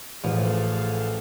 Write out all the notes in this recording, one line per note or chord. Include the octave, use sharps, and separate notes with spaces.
A1 F3 G#4 A4 F5